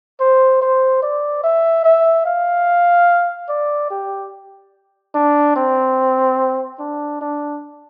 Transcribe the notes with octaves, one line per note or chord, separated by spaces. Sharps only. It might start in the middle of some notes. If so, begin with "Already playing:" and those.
C5
C5
D5
E5
E5
F5
D5
G4
D4
C4
D4
D4